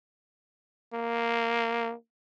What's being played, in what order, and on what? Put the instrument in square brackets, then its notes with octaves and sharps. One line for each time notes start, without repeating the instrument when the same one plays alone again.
[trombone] A#3